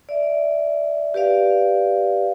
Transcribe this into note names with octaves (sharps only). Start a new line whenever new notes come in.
D5 E5
G4 B4 D5 F5